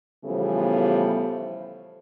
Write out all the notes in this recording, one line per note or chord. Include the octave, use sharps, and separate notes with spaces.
C#3 E3 F3 G3 A3 B3